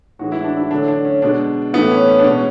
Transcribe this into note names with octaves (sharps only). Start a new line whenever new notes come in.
A2 E3 G#3 F#4
E4
D4
E4
D3 F#3 A3 D4
D4
C#4
B2 G#3 D4
A2 E3 A3 B3
C#4
C#4
D4
B2 G#3 C#4